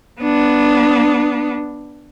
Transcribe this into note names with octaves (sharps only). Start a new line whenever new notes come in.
B3 D4